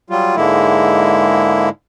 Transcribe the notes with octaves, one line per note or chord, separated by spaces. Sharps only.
F#3 G3 F4
G#2 D3 G#3 A#3 E4